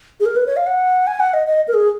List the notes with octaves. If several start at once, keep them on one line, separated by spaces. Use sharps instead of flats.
G#4
A#4
B4
C#5
F5
F#5
G#5
F#5
D#5
D#5
A#4
G#4